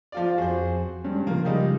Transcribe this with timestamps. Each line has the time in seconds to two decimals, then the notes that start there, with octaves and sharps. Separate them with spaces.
0.12 F3 F4 D5
0.38 F2 F#4 G#4 C5
1.04 G2 G#3 C#4
1.27 C#3 F3 A#3
1.45 G3 G#3 D#4